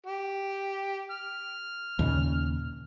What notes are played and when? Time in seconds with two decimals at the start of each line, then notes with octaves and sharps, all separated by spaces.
0.07 G4
1.12 F6
1.99 D#2 A#2 C#3